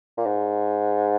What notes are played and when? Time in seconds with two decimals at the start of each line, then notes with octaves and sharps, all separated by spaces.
0.17 A#2
0.26 G#2